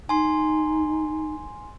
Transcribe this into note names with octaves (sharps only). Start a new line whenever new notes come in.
D#4 G#5 C6